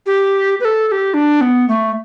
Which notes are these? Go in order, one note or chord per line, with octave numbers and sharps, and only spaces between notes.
G4
B4
A4
A4
G4
D4
B3
A3